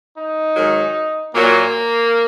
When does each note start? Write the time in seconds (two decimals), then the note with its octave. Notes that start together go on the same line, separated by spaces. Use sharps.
0.17 D#4
0.56 G#2 D#3 F#3
1.34 A#2 F#3 A#3